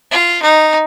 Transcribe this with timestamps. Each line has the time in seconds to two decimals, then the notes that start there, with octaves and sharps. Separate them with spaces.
0.11 F4
0.42 D#4